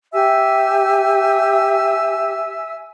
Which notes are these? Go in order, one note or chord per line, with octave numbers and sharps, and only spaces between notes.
G4 E5 G#5 E6